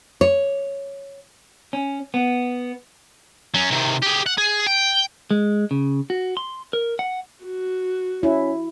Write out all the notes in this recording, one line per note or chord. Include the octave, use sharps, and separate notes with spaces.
C#5
C#4
B3
F#3 C#4
C3 D#3
G4 G#4
F#5
G#4
G5
G#3
C#3
F#4
C6
A#4
F#5
F#4
C#4 E4